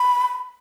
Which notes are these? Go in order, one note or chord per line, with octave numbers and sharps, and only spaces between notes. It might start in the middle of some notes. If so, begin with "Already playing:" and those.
Already playing: B5